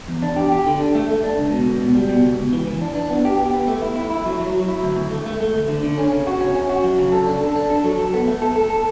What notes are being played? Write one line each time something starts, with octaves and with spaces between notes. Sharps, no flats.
E2
D4
G4
G4
D3
D4
A3
A3
D4
C#2
B2
C#2
B2
G3
B2
C#2
C#2
E3
E3
D4
D4
B3
G4
G4
B3
A3
E4
E4
E4
F#3
F#3
F#3
E4
D2
D2
A3
A3
A3
D2
D3
D3
C#4
C#3
F#4
C#4
C#4
F#4
F#3
C#3
A4
D4
A4
D4
A4
F#3
A4
B3
A3
A4
A4
A4